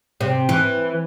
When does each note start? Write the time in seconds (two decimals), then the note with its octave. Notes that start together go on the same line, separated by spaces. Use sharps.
0.21 C3
0.49 E3